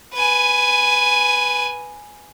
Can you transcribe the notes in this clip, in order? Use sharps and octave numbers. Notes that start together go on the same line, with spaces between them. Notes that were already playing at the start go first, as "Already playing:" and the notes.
B4 G#5